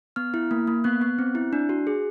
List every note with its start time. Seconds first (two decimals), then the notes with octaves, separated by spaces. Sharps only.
0.16 B3 F6
0.34 E4
0.51 A#3
0.67 A#3
0.84 B3 F#6
1.01 B3
1.19 C4
1.35 E4
1.53 D4
1.69 F#4
1.87 G#4